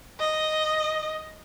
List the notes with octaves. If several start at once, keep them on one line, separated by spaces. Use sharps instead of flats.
D#5